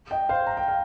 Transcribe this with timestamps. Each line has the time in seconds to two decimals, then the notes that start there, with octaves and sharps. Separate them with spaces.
0.11 D#5 G5
0.29 C5 F5
0.47 A#5
0.57 G5
0.68 F5